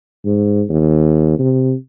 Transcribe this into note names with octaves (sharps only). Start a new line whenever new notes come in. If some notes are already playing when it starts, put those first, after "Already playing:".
G#2
D#2
C3